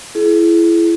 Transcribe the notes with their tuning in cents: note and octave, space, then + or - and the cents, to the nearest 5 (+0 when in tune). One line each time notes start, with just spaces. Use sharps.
E4 +25 G#4 +35